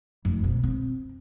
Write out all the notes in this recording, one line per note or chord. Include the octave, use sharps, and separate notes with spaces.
F1
B2
C4